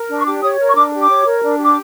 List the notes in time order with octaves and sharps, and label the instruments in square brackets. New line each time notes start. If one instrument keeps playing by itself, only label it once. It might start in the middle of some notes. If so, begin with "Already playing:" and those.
Already playing: [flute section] A#4
D4
C#6
G4 D6
C#5 D#6
A#4
C#6
D4 D6
G4
D6
C#5
A#4
D4
G4
D6